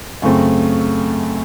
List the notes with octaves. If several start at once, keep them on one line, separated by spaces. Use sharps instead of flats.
F#2 C#3 A3 C4